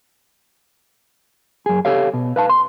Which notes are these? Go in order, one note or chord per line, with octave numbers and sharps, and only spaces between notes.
F#2 G#4
G4 A4 C#5 F5
B2
B4 F5 A5
C6